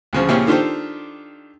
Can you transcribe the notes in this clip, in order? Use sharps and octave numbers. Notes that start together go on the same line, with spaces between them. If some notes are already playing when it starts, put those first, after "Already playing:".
D2 C#3 F3
A#2 C#3 F3 C#4 E4 G4
D#3 D4 F4 G4 A4 C5